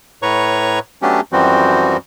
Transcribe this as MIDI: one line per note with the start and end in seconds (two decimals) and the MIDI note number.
0.22 0.79 45
0.22 0.79 71
0.22 0.79 73
0.22 0.79 82
0.22 0.79 85
1.02 1.21 54
1.02 1.21 57
1.02 1.21 59
1.02 1.21 61
1.02 1.21 62
1.02 1.21 67
1.32 1.97 42
1.32 1.97 52
1.32 1.97 53
1.32 1.97 55
1.32 1.97 60
1.32 1.97 66